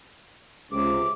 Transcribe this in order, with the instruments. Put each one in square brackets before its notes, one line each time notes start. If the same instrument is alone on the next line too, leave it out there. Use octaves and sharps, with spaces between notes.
[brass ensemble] C#2 C3 [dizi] D6